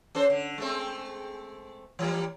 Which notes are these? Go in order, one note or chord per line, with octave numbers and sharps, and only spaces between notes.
C#4 A4 C5
D3
G#3 A3 C4
E3 G3 A#3